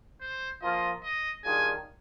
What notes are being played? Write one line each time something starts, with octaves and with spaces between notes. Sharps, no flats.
C5
F3 A#3 F4 D#5
D#5
D#3 G3 D4 F4 G#4 G#5